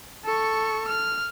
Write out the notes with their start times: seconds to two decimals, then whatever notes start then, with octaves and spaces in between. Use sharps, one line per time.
0.25 A4 C#6
0.88 F6